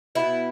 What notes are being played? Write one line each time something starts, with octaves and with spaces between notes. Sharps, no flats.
B2 B3 E4